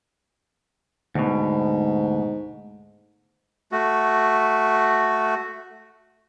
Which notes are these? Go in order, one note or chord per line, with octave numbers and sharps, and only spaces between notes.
D2 G#2 B2
A3 F#4